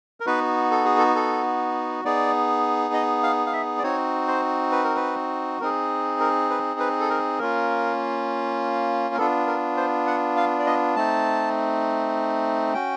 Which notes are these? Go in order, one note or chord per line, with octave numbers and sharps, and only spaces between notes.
A#4
B3 D#4 F#4 B4
A4
G#4
A4
A4
B3 D#4 G#4 D5
D#5
F5
F5
E5
D5
C4 D#4 F#4 C#5
C5
B4
A#4
B4
C4 D#4 G#4 A#4
A#4
B4
B4
A4
A#4
A#3 C#4 F4 A#4
A#4
B3 D4 F4 A4
A#4
C5
F#5
F5
D5
D#5
A3 C4 D#4 A5
C#4 F#4 G5